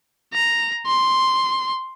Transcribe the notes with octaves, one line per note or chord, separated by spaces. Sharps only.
A#5
C6